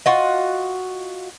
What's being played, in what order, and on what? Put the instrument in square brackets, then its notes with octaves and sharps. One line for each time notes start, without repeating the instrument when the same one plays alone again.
[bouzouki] F4 F#4 D#5